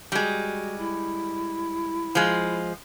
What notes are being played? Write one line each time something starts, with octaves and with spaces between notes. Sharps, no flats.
G3 G#3 F#4
E4
F3 G#3